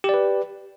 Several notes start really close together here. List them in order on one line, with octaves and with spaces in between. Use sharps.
G4 D5 B4